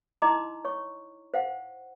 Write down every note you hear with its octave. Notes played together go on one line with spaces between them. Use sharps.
D#4 E4 D#5 A#5 C6 D6
C#5 C#6
C5 F5 F#5